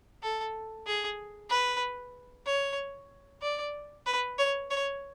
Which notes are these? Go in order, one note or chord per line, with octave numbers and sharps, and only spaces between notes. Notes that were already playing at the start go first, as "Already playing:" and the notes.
A4
G#4
B4
C#5
D5
B4
C#5
C#5